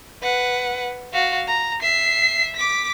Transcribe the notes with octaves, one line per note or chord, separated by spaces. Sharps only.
B4 F#5
F#4 F5
A#5
E5 C7
D6 B6